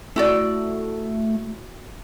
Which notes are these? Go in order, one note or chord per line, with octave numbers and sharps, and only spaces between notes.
A3 E4 F#4 D5